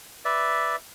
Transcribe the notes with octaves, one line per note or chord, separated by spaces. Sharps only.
B4 D5 E5